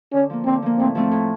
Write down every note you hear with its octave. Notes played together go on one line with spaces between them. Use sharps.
D3 C#4
F3 A#3
D3 C4
F3 A#3
A2 C4
F3 A3 C4
A2